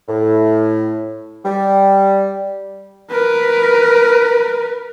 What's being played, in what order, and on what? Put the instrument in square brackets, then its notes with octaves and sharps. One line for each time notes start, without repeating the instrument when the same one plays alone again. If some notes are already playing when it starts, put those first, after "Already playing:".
[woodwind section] A2
G3
[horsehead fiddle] A#4 B4